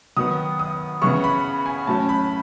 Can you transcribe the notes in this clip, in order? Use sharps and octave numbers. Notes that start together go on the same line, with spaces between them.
D#3 F#3 B3 D#6
D#6
C#3 E3 B3 C#6
B5
G#5
A2 F#3 C#4 A5
B5